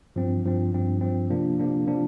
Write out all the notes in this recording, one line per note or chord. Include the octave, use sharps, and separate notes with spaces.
G2 F3 C4
G2 F3 C4
G2 F3 C4
G2 F3 C4
C3 F3 A#3 D4
C3 F3 A#3 D4
C3 F3 A#3 D4